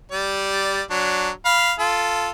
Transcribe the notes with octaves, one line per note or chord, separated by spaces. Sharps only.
G3 D5
F#3 D4
F5 B5
F4 A4